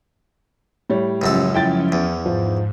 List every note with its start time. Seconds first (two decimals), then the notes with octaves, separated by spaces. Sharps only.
0.90 A2 G3 C#5
1.22 C#2 F#2 F3 C#4 A4
1.54 E4 G5 A6
1.92 E2
2.26 G#2 F3